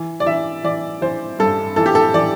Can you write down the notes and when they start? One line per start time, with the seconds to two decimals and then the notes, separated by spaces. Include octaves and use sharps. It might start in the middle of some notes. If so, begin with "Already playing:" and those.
Already playing: E3
0.20 D5
0.26 E3 E5
0.64 E3 D5
1.01 E3 C5
1.39 G2 A4
1.76 E3 A4
1.86 G4
1.95 A4
2.14 E3 D5